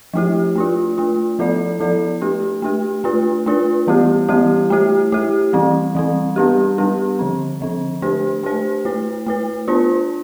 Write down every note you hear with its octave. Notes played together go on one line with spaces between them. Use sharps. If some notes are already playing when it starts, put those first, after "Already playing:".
F3 A3 E4 G4
A3 D4 F4
A3 D4 F4
F3 B3 E4 A4 D5
F3 B3 E4 A4 D5
A3 D4 G4
A3 D4 G4
A3 D4 F4 B4
A3 D4 F4 B4
E3 G3 B3 E4 G4
E3 G3 B3 E4 G4
A3 E4 G4
A3 E4 G4
E3 G3 C4
E3 G3 C4
G3 B3 D4 G4
G3 B3 D4 G4
D3 F3 C4
D3 F3 C4
A3 D4 G4 C5
A3 D4 G4 C5
A3 E4 B4
A3 E4 B4
B3 D4 F4 C5